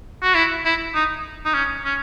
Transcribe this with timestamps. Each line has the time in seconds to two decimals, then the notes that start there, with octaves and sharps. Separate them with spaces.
0.23 F#4
0.35 E4
0.65 E4
0.94 D#4
1.45 D#4
1.54 C#4
1.85 C#4